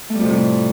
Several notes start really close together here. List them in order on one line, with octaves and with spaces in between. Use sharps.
A3 G3 F2 C3 A2